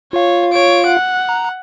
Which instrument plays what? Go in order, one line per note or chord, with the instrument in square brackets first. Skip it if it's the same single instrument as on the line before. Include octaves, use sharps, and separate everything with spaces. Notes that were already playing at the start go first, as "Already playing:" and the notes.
[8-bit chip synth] F4 F5 [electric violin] C#5
[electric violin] C#5 D7
F#5
[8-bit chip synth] A#5